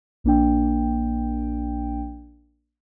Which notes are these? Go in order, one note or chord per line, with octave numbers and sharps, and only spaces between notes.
A#1 A#3 D4 G5